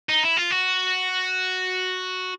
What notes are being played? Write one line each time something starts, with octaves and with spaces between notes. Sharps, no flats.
D#4
E4
F4
F#4